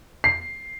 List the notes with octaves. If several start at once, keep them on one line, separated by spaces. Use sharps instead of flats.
C7